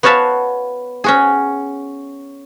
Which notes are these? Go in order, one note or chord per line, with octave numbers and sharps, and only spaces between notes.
B3 F#4 C#5 F5 A5 B5
C#4 F#4 G#4